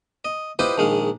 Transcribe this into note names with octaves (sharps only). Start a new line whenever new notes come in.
D#5
E4 F4 G4 B4 C5 D#5
A#1 D#3 G#3 F5